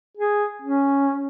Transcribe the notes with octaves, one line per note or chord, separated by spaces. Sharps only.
G#4
C#4